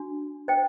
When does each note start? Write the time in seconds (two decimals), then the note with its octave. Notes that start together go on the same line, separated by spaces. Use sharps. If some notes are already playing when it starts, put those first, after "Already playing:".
Already playing: D4 F#4
0.48 C5 D#5 G5